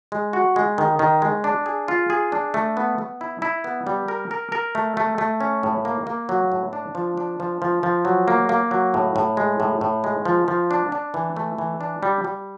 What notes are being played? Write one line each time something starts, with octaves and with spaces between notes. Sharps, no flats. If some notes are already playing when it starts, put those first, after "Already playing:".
G#3
F#4
G#3
D#3
D#3
G#3
D4
G#4
F4
G#4
D4
A3
B3
B3
E4
E4
B3
G3
A#4
A#4
A#4
A3
A3
A3
C#4
A2
A#3
A#3
F#3
A2
D4
F3
D4
F3
F3
F3
F#3
A#3
A#3
F#3
A2
A2
G#3
A2
A2
G#3
F3
F3
D4
D4
E3
A3
E3
D4
G3
G3